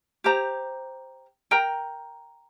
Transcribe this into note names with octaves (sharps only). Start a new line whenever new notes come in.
G4 C5 A#5
A#4 G5 A#5